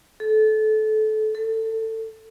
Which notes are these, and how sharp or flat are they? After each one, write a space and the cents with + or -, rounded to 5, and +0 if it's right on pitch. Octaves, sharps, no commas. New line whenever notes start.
A4 -25
A4 +20